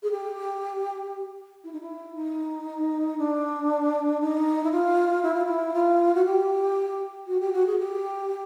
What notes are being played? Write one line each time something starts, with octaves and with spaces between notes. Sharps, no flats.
G#4
G4
E4
D#4
E4
D#4
D4
D#4
E4
F4
E4
F4
E4
F4
F#4
G4
F#4
G4
F#4
G#4
G4